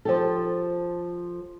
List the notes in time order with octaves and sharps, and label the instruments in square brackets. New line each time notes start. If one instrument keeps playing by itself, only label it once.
[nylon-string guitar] F3 G4 A4